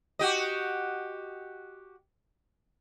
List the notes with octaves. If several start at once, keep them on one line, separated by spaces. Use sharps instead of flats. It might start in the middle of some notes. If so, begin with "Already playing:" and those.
F#4 G4 D#5